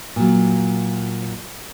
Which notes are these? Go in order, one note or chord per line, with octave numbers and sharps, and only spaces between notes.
A#2 F#3